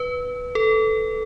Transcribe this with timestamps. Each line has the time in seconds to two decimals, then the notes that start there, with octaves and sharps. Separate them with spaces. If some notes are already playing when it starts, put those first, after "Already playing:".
Already playing: B4
0.55 A4